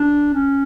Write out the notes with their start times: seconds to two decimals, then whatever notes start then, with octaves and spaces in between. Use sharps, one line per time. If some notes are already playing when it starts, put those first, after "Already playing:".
Already playing: D4
0.34 C#4